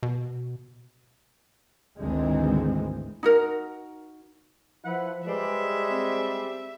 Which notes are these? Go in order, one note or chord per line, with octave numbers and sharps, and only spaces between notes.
B2
G#1 D2 D#3 E3 G#3 C4
D#4 F#4 A#4
F3 E4 B4 F#5
G3 G#3 B4 C5 D5 E5
C4